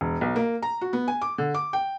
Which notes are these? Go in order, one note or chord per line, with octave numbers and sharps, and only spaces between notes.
E1
B1
A#3
A#5
F#4
B3
G#5
D6
D3
D6
G5